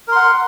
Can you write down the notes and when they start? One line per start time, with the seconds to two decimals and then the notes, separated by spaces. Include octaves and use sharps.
0.08 A#4
0.12 C6
0.16 F#5